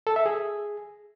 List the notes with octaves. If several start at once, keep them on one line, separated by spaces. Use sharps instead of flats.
A4
E5
G#4